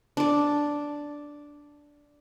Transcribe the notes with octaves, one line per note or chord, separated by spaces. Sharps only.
D4 D5